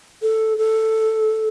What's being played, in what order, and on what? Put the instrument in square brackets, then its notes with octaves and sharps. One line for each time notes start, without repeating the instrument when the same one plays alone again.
[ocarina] A4
A4